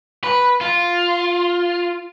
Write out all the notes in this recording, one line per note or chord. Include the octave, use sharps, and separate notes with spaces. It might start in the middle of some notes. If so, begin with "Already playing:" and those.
B4
F4